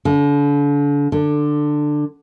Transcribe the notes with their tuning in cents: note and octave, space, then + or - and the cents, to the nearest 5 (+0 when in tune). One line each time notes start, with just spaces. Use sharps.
D3 -35
D3 +15